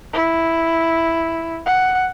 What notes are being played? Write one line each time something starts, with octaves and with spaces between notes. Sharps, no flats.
E4
F#5